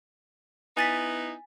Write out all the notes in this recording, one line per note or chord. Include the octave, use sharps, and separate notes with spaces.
B3 D#4 E4 G#5 A6 B6